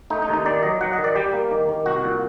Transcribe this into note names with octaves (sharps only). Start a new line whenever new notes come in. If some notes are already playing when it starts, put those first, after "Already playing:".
A3 D#4
D#4
D#2
D#4
D#3 D5
F#3 D#5
F#3 F#5
D#5
D#3
D5
G3 G4
A#3
D#3
D#3
C2 F#4
A#2